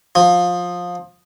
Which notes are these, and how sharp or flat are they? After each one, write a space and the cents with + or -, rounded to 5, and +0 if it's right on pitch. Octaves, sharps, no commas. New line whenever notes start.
F3 +20